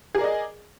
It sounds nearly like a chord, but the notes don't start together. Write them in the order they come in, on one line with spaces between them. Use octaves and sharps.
G#4 A#4 D5 D#5